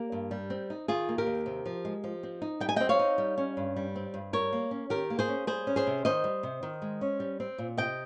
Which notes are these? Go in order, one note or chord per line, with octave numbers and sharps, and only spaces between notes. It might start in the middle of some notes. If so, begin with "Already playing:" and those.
Already playing: A#3 G4 A#4
G2
G3
C4
D#4
D#3 F4 G#4
A#3
G4 A#4
D#2
C3
F3
G#3
F3
C4
D#4
G3 G5
G#5
C4 D#5 G5
C#5 F5
D#4
G3
C#4
G2
G3
C4
G2
G3 A#4 C#5
A#3
C#4
D#3 G4 A#4
A#3
G#4 C5
C#4
G3 G#4 C5
C#4
G#4 C5
C3
D#3 C5 D#5
G3
C3
D#3
G#3
C#4
G3
C4
A#2
C3 D#5 G5